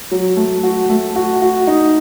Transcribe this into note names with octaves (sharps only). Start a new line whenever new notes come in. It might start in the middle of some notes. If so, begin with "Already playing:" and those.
F#3
A3
F#4
A3
F#4
F#4
D#4